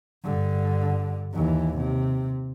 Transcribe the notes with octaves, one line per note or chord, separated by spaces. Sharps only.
G2 D3
D#2 E3
C3